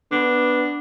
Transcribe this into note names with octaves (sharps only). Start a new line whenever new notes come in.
B3 D4